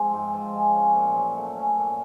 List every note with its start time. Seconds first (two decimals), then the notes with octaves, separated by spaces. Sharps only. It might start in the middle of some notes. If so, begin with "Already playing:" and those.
Already playing: F3 G#3 C4
0.13 G#2
0.34 F3
0.54 G#3
0.75 C#4
0.95 A#2
1.16 F#3
1.37 A3
1.57 C#4
1.78 A#2